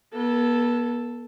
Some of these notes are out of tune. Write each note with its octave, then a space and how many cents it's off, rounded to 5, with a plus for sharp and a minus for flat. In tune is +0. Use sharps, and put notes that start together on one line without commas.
B3 -45 A4 +0